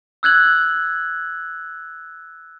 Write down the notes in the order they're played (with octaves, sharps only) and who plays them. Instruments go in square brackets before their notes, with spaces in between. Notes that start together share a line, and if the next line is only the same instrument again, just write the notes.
[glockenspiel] E6 F#6 G#6 F#7